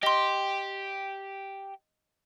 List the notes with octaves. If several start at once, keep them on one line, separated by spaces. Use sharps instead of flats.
G4 D#5 C6